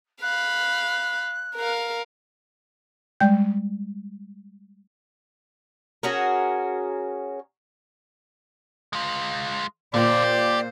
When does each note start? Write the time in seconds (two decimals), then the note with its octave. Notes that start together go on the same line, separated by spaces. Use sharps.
0.21 F5 B5 F#6
1.56 A#4 F5
3.20 G3 G#3 D5 G5 G6
6.03 C#4 F#4 G#4 A#4
8.93 G#3 F4
9.94 A#2 D3 G4 C5 D5
10.24 G4